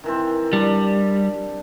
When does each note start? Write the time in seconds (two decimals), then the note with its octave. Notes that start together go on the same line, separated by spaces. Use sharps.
0.04 D#3 E3 C4
0.53 G3 D4